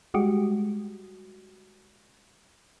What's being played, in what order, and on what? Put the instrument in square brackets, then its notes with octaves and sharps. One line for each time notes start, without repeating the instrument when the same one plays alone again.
[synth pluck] G3 G#3 F#4 G4